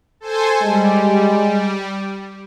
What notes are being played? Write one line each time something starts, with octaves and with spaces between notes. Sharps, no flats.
A4 C5 G#5
G3 G#3